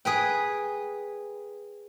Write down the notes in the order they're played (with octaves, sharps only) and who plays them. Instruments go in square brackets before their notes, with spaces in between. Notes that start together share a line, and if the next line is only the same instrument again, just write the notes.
[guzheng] G#4 B4 G5